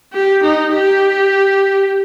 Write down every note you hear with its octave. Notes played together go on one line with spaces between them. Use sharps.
G4
D#4
G4